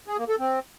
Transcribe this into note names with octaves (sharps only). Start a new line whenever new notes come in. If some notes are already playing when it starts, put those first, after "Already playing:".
G#4
A#3
A4
C4